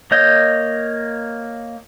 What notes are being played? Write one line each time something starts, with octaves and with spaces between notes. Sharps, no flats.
A#3 C#5 D#5 G6